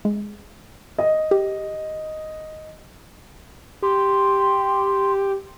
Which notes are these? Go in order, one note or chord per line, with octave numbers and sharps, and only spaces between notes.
G#3
D#5
G4
G4 C6